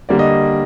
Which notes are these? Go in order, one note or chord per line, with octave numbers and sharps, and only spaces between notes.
D3 G3 A#3 D5
D#5